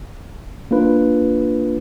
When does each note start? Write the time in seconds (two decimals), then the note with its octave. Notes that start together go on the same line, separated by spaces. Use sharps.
0.71 A#3 D4 F4 B4